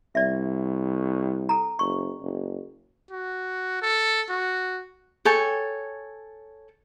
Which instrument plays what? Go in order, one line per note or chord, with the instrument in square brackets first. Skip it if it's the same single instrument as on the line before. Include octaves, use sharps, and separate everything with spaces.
[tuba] C2 [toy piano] D5 E5
[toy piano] A4 A#5
[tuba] F#1 [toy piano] C#6
[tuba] F#1
[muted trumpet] F#4
A4
F#4
[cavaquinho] A4 C#5 G5 G#5